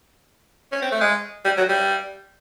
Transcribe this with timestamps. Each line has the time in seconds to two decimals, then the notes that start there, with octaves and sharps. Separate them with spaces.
0.72 C#4
0.82 C4
0.92 A3
1.01 G#3
1.45 G3
1.58 F#3
1.69 G3